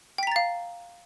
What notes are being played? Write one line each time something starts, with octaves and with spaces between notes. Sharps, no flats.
F5 G5 A#5 A6 B6